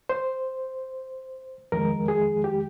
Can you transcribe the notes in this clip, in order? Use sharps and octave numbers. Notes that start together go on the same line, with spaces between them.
C5
F2 D#3 G#3 A#4
G#4
G4